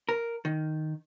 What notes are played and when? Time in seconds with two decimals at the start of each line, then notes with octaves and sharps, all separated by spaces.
0.09 A#4
0.45 D#3